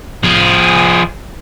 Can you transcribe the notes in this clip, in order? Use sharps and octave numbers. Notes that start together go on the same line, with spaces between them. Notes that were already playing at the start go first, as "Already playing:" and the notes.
F3 G#4